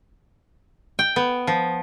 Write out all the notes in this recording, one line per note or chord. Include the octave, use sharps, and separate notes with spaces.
G5
B3
F3